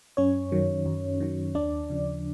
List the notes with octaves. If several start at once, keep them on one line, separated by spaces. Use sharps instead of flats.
F#2 C#4 C#5
D#3 F#3
F#2
D#3 F#3
D#2 D4 D5
C#3 F3